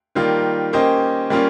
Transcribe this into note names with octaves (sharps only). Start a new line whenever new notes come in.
D#3 G3 A#3 F4
A#3 C#4 G4 C5 D#5
G3 A#3 C#4 F4